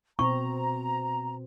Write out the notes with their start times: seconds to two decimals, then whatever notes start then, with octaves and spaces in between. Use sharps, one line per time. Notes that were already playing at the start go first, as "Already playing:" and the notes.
0.19 B2 C4 A#5 C#6